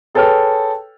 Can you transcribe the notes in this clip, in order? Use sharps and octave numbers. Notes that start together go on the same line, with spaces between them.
G#4 A4 B4 C#5 G5 F6